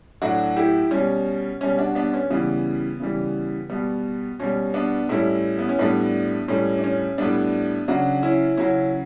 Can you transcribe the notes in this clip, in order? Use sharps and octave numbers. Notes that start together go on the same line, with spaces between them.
A2 F#3 D4 F#4
E4 G4
B2 G3 C#4
B2 G3 C#4
D4 F#4
B3 D4
C#4
C#3 E3 G3 B3
C#3 E3 G3
B2 G3 B3
B2 G3 C#4
B3 D4
A2 G3 C#4 E4
B3
C#4
A2 G3 B3 D4
A2 G3 C#4
D4
C#4
A2 G3 B3 D4
C#3 F#3 D4 F#4
C#4 E4
C#3 F#3 C#4 E4